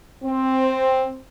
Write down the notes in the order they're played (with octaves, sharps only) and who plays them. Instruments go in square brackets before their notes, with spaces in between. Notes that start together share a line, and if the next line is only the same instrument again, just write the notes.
[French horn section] C4